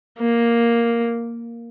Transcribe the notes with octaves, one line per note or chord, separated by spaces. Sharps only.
A#3